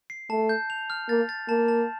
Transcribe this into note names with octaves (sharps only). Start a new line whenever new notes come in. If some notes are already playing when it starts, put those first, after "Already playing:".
C7
A3 A5
G6
F7
F6
A#3 A6
A6
A#3 A5
A5